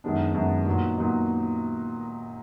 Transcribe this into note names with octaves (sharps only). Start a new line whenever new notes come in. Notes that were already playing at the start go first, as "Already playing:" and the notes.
F#2 D#3 G#3 B3 D4
F#2 D#3 G#3 B3 D4
A#2 F#3 B3 D#4
A#2 F#3 B3 D#4